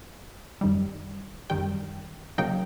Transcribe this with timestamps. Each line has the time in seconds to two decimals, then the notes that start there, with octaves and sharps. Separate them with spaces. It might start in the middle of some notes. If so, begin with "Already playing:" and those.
0.61 F#2 D#3 G3
1.50 F#2 D#3 G3 G5
2.38 C#3 F#3 A#3 D#4 G5